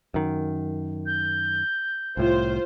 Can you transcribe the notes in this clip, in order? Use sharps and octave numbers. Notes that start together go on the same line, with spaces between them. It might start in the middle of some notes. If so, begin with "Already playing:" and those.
F#2 D#3
G6
C2 A2 F4 C5